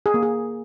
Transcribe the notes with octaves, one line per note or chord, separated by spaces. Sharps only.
G#4
A#3
G#4